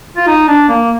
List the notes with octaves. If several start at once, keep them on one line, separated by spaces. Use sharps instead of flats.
F4
D#4
D4
A#3